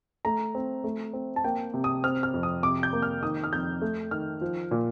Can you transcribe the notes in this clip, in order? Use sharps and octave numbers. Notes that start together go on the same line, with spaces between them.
A3 A#5
C4
A3
C4
A5
A#3 G5
C3
D#6
C4 F6
F6
F2
D#6
C3 D6
G6
A#3
F6
D#3 D#6
F6
F2 G6
A3
D#3 F6
F3
A#2